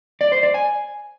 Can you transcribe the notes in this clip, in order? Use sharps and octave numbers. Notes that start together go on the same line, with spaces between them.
D5
C5
D5
G#5